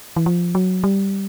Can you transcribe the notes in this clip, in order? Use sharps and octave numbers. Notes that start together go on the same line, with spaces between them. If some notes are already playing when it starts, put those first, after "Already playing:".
E3
F3
F#3
G3